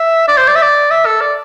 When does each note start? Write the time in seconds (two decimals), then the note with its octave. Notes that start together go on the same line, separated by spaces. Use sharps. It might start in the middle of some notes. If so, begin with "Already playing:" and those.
Already playing: E5
0.28 D5
0.37 C5
0.48 D5
0.56 E5
0.62 D5
0.91 E5
1.06 A4
1.21 D5